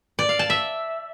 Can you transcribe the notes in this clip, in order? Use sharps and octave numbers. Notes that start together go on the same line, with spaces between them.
D5
F5
A5
E5